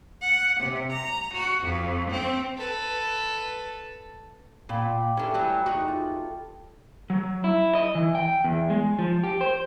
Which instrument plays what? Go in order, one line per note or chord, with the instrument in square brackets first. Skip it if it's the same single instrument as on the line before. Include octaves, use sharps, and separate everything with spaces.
[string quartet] F#5
C3
A#5
F#4
F2
C4
[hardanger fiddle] A4 B4
[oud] A#2 [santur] D5 G5 B5
[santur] A3 G4 [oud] C#4 D4
[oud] E3 F#3 G3
E2 D#4 F#4
[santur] F4
[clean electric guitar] F#3
E4
D#5
E3
G5
E2
G#3
F3
G4
C5